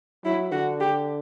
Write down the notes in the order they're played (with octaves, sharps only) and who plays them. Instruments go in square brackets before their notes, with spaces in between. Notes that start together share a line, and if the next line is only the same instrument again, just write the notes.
[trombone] F#3 [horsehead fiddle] E4
[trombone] D3 [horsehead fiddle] F#4
[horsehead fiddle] G4